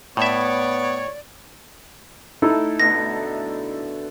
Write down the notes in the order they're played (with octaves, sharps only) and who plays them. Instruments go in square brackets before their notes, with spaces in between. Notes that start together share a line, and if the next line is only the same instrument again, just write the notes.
[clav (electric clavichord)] A2 E5 [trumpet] B3 [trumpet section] C#5 [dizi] D5
[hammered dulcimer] A3 [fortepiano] D#4 E4 A4
[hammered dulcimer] B2 D3 A3 [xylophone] A#6